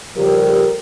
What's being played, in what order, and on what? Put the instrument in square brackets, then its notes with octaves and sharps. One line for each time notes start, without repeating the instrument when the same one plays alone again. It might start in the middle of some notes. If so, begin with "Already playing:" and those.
[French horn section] C#3 F3 G3 G4 A4 A#4